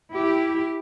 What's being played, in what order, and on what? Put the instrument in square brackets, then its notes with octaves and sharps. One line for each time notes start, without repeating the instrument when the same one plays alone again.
[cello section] E4 G4